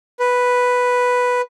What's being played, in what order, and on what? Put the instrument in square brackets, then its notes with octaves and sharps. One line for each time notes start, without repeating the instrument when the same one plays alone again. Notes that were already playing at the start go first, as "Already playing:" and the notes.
[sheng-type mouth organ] B4